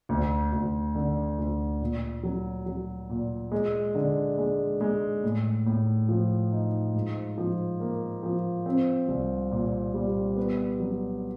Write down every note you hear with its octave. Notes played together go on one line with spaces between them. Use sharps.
D2
D2
D3
D2
A#2
F#3
F#3
A#2
G#3
D3
G#3
G#3
A2
A2
F3
D#4
G#2
F3
A#3
F3
C4
C2
A#2
G3
B3
F#3